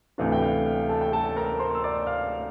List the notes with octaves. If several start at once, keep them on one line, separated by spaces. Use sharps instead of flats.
D2 C3 E3 A3 D4 F5
G5
F5
F5
A4 A5
G5
A4 A5
A5
A#4 A#5
C5 C6
E6
D5 D6
F5 F6